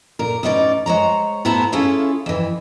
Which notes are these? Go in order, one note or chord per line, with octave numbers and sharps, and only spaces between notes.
A#2 A#4
E2 A2 C#4 D#4 D5
G#3 C5 C#5 A#5
A2 B3 E4 C5 A5 A#5
C#4 E4 F4 G#4 A4 C#5
F2 E3